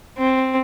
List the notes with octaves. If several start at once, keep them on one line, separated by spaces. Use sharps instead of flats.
C4